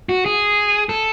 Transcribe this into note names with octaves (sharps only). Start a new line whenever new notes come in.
F#4
G#4
A4